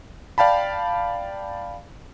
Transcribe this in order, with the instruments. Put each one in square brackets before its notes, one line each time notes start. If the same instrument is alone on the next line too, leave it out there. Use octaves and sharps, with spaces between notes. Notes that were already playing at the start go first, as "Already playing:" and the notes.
[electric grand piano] D5 F5 G5 A5 B5